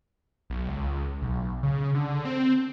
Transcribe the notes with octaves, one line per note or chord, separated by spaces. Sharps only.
B1
C#2
B1
C#3
D3
C4